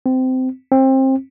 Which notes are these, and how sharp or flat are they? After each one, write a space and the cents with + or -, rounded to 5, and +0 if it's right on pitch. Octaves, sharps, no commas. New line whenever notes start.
C4 -20
C4 +25